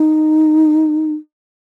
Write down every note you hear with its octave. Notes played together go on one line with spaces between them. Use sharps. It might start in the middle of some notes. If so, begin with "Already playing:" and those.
Already playing: D#4